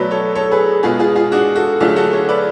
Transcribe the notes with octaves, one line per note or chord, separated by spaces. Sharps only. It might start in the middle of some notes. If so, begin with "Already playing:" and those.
Already playing: B2 F#3 A3 B4 D5
A4 C#5
A4 C#5
G#4 B4
B2 G#3 B3 F4 G#4
F4 G#4
F4 G#4
D4 F#4
F#4 A4
D3 F#3 A3 F4 G#4
F#4 A4
A4 C#5
B4 D5